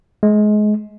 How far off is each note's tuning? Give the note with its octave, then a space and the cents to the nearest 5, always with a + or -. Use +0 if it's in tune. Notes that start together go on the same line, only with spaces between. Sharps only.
G#3 +25